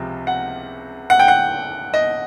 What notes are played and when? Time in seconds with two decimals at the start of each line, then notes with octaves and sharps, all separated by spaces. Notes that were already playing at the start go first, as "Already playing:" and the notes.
Already playing: C#2 C3 F3
0.27 F#5
1.10 F#5
1.19 G5
1.28 F#5
1.94 D#5